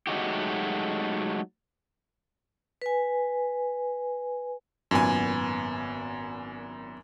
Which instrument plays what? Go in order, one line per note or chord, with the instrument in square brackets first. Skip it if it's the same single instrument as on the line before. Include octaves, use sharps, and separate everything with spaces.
[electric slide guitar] F#3 G#3 A3 D#4 F#4 G4
[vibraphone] B4 G#5
[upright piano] G#1 B3 B5 [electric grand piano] F#2 A#2 G#5